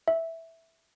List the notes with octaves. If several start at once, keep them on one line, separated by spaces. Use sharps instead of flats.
E5